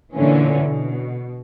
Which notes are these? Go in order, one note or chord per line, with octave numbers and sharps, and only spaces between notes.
A#2 D3 E3 C#4
B2